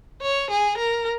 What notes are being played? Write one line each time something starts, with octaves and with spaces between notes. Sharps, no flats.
C#5
G#4
A#4